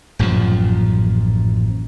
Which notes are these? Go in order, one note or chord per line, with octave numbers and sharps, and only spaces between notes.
A1 F#2 A#2 F3